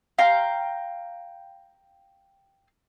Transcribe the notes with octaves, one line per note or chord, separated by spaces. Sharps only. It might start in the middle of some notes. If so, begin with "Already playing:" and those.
F5 G5 A#5 C6